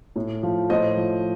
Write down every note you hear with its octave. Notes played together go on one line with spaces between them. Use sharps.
A2
F3
A2 C5 D#5
F3